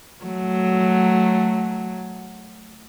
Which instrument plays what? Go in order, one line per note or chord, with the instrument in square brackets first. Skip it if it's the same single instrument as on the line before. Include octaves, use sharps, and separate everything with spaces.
[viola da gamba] F#3 A3